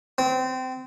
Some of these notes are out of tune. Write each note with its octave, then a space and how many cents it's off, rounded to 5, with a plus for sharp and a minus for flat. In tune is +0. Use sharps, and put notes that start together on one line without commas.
C4 -25